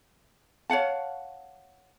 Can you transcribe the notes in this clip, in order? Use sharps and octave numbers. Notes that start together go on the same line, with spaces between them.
C#5 F5 F#5 A5